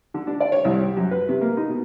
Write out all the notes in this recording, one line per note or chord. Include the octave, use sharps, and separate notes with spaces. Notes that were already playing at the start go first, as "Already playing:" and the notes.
D3
D4
D5
C#5
C2
G4
F#2
B4
C3
A#3
D#4
B2